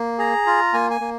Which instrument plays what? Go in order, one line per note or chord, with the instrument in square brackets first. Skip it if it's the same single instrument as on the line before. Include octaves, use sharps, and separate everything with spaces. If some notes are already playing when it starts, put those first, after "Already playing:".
Already playing: [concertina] A#3
G#4 A#5
F4
A#3 G#5
G#5
A#3